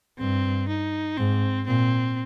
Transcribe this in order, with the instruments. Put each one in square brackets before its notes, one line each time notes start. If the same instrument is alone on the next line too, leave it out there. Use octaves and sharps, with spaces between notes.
[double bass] G2 [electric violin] C4
[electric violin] D#4
[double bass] G#2 [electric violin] C4
[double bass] A#2 [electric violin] C4